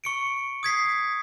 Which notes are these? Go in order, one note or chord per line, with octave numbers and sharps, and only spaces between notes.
C#6 C#7 D7
D#6 G#6 B6 C7